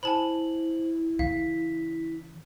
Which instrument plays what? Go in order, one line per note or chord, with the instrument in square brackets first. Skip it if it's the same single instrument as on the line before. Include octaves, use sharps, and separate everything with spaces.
[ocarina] E4 [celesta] C5 F#7 [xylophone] G#5 A5 B5
[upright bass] C#3 E3 [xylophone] F5 [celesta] B6